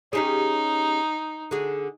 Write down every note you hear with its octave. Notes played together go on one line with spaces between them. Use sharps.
C#4 D#4 G4 G#4
D3 F#4 G#4